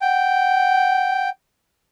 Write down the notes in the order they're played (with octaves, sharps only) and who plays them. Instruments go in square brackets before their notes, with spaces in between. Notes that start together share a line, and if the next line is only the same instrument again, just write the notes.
[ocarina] F#5 [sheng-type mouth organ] G5